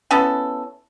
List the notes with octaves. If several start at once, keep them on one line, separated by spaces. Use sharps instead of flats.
B3 C#4 E4 A4